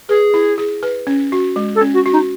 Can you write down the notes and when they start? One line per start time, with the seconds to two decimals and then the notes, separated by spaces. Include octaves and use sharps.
0.09 G#4 B4
0.34 E4
0.58 G#4
0.83 B4
1.07 C#4
1.32 F#4
1.56 G#3
1.75 A4
1.81 C#4
1.93 F#4
2.06 F#4
2.12 D#4